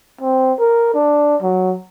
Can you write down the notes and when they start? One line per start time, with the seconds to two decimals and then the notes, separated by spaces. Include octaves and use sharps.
0.21 C4
0.60 A#4
0.94 D4
1.42 F#3